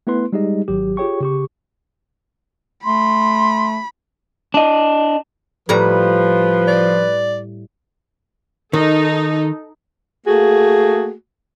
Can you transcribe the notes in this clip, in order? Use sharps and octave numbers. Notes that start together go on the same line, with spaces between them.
A3 B3 E4 B4 C6
G3 G#3 D#4 G4 G#4 D#5
G#1 F#3 G4
F4 G4 G#4 C#5 G5 C#6
C#3 G4 C#6
A3 B5 C6
D4 D#5
A2 F3 G3 B4 A#5
D5
D#3 D#4 A4
A3 A#3 F#4 G#4